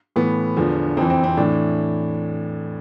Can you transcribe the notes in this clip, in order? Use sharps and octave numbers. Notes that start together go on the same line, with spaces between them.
A2 E3 B3
E2 D3 F3
F2 E3 C4
C4
C4
A2 E3 D4